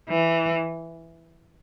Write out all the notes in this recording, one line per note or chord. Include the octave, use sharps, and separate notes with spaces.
E3